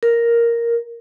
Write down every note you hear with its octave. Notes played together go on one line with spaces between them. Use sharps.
A#4